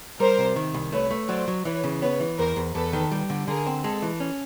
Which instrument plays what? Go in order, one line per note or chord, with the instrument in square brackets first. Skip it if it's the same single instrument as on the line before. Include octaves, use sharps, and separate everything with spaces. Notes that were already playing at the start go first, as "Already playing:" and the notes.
[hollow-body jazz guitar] G3 [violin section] A#4 C5
[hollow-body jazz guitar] C3
D#3
C2
[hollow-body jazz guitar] A3 [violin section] B4 C#5
[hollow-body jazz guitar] A3
[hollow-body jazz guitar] F#3 [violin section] C5 D5
[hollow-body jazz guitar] F#3
[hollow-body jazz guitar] E3 [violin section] B4 C#5
[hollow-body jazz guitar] C#3
[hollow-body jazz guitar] B3 [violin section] B4 C#5
[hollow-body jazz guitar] E3
[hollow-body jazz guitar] E2 [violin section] A#4 C5
[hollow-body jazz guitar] E2
[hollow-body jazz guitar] E2 [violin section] A4 B4
[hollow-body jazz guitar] D#3
G3
D3
[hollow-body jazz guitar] D3 [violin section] G#4 A#4
[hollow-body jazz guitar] C4
[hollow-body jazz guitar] G#3 [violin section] A4
[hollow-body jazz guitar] E3
C#4